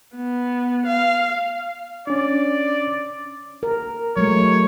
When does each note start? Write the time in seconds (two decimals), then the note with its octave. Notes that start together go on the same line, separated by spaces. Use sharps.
0.16 B3
0.87 F5
2.07 C#4 D4 D5
3.63 A#4
4.17 F#3 G#3 A3 C#5